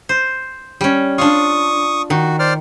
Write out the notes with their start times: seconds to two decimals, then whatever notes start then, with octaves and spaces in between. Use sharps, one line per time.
0.09 C5
0.81 G3 C#4
1.18 D4 F4 C#6 D#6
2.10 D#3 F#4
2.39 C5 D5 F6